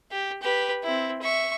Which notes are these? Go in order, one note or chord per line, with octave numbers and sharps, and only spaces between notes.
G4
G4 B4
C4 E4
E5 C#6